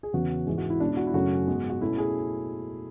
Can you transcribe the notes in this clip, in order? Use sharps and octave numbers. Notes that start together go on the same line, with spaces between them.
G#4
E2 C#3 E3 B3 F#4
G#2 E3 G#3 C#4 G#4
F#4
E4
B2 G#3 C#4 D4
E4
F#4
E4
F#2 C#3 F#3 A3 C#4 F#4
G#2 G#3 B3
F#4
B2 A3 C#4 E4
G#4